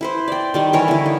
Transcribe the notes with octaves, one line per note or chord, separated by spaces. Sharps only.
E4 B4 C5
D5 G5
D#3 G3 D5
E3 A#4 C#5
D3 E4
D#4